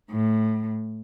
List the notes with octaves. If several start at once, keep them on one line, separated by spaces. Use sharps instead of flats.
A2